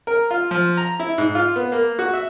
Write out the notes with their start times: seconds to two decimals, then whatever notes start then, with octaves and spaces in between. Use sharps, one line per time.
0.07 A#4
0.31 F4
0.51 F3
0.77 A#5
1.00 E4
1.18 G#2
1.35 F4
1.56 B3
1.72 A#3
1.99 F#4
2.13 E5